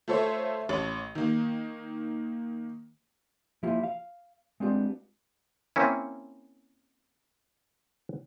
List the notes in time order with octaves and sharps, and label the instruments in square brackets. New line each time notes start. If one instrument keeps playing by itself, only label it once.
[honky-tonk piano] A3 F4 A4 C5 C#5 E5
A1 C#5 F#7
D#3 A#3
[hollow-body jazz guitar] F3 A#3 E4 F4 G4
F5
G#3 B3 C4 D4 F4 G4
[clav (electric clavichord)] A#3 C4 C#4 E4